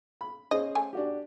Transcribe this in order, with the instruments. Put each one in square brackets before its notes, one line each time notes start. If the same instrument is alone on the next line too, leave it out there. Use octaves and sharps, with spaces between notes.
[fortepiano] B5
[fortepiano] C#4 G#4 C5 [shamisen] D#5
[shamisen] A3 G#5
[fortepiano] D4 F#4 G4